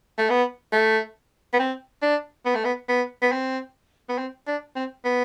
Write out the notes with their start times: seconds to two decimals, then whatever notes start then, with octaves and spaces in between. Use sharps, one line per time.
0.18 A3
0.30 B3
0.72 A3
1.53 B3
1.59 C4
2.02 D4
2.45 B3
2.55 A3
2.65 B3
2.89 B3
3.22 B3
3.32 C4
4.09 B3
4.18 C4
4.47 D4
4.76 C4
5.04 B3